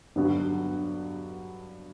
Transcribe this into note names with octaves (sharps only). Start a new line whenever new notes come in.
G2 D3 F#3 B3 F#4